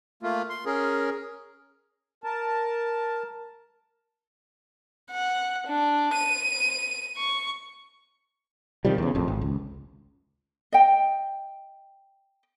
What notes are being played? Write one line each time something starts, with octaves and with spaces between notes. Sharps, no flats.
A3 A#3 F4
C6
C#4 G#4 A#4
A#4 A5
F#5
D4
D#7
C#6
C3 D#3 F3 G3
E2 C#3
A1 F2
G#1
C#2
D#5 G5